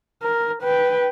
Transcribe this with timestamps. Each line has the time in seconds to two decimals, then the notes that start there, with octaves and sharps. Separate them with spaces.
0.23 A#4
0.62 B4 G5